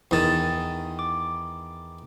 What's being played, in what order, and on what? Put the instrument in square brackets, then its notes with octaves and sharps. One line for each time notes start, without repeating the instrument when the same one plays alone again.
[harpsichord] E2 D#3 [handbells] D#4 D#6 A6
[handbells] D6